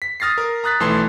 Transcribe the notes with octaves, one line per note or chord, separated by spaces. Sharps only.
B6
D#6 F6 A6 A#6 C7
A#4
A#5 D#6 F#6 A6 B6
B1 E3 A3 A5 C6 C7